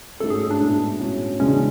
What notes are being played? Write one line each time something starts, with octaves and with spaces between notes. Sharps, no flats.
G#2 F#3 A3 C#4 A4
G#4
D4
A2 G#3 B3 E4
A2 F#3 C#4 E4
E2 C#3 E3 G#3 C#4 D4